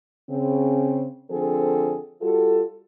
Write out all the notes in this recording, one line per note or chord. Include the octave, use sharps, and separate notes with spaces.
C#3 C4
D3 F3 C4 G#4 A4
G3 F4 F#4 A4